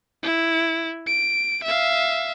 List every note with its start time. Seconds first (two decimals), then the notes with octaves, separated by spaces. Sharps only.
0.23 E4
1.07 D7
1.64 E5 F5